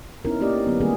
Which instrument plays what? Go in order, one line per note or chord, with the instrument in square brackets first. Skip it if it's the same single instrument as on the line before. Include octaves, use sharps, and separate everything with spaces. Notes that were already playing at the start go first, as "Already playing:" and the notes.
[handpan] B3 C#4 D#4 E4 A#4
A#3 C4 C#4 G4 D5 D#5
A#4
D3 F#3 B3
D#3 G3 A3 A#3 C#4 G#4